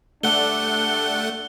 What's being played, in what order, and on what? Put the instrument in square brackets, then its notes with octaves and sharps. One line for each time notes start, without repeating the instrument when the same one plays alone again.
[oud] D2 G3 D5 [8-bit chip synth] A3 F#5 [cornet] D4 [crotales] G7